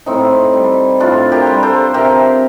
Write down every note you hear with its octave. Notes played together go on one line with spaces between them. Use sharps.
A2 C4 D#4
G3
A2 D4 F4
G4 A#4
G3
A4 C5
C3 G4 A#4